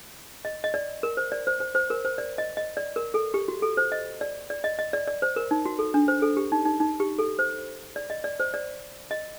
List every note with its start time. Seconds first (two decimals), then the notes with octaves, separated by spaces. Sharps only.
0.45 D#5
0.64 D#5
0.74 D5
1.03 A#4
1.17 C5
1.32 D5
1.47 C5
1.60 C5
1.75 C5
1.90 A#4
2.05 C5
2.18 D5
2.38 D#5
2.57 D#5
2.77 D5
2.96 A#4
3.14 A4
3.34 G4
3.48 F#4
3.62 A4
3.77 C5
3.92 D#5
4.21 D5
4.50 D5
4.64 D#5
4.79 D#5
4.93 D5
5.07 D5
5.22 C5
5.36 A#4
5.51 D#4
5.66 F#4
5.79 A4
5.94 D4
6.08 C5
6.22 A4
6.37 G4
6.52 D#4
6.65 D#4
6.80 D#4
7.00 G4
7.19 A4
7.39 C5
7.96 D5
8.10 D#5
8.24 D5
8.40 C5
8.54 D5
9.11 D#5